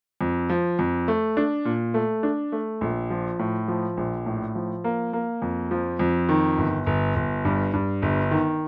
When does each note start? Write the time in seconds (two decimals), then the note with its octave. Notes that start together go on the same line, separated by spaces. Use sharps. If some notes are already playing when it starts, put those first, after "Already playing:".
0.21 F2
0.49 F3
0.79 F2
1.08 A3
1.37 D4
1.65 A#2
1.94 A3
2.23 D4
2.52 A3
2.81 A#1
3.10 F3
3.39 A2
3.68 F3
3.97 A#1
4.26 A2
4.55 F3
4.84 A#3
5.13 A#3
5.42 F2
5.71 F3
5.99 F2
6.29 D#3
6.58 G1
6.87 G1
7.16 G1
7.45 G2
7.73 G2
8.02 G1
8.31 D#3